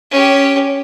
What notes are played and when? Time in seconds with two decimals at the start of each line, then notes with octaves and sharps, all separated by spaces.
0.11 C#4 G4